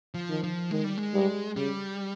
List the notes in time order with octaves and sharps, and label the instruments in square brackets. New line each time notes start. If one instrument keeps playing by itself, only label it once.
[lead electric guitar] F3
[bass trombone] D#3
[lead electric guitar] F3
[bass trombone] D#3 [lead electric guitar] G#3
[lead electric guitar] G3
G#3
[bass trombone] G3
[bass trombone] C#3 [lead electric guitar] G3